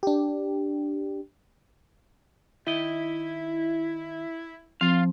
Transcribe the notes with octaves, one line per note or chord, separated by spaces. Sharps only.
D4 G4
D#3 E4 D#5
F3 C4 F4 F5